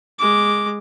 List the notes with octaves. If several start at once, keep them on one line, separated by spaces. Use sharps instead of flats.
G#3 D6